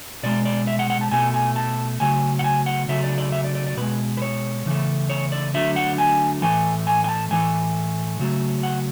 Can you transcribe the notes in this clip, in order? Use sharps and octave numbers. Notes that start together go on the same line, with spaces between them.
B2 G#3 D5
D5
E5
F#5
F#5
A5
B2 A3 G#5
G#5
A5
C#3 F#3 A3 G#5
F#5
G#5
F#5
C#3 F#3 A3 E5
D5
D5
E5
D5
D5
D5
B2 G#3 B4
B4
C#5
C#3 E3 A3
C#5
D5
D3 F#3 A3 E5
F#5
G#5
A2 E3 A3 G#5
G#5
G#5
A5
A2 E3 A3 G#5
C#3 F#3 A3
F#5